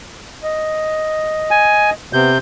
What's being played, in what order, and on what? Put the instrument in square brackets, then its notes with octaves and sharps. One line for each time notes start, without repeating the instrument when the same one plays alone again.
[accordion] D#5
[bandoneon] G#5
[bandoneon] C3 G6 [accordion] B3